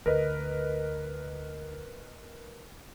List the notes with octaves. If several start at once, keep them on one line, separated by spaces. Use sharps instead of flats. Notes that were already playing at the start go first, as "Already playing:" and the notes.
D2 A#4 B4 D#5